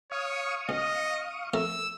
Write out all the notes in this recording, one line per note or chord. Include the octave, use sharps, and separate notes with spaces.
C#5 F5 C#6 D#6
C#2 D#5
F2 A3 A#4 E6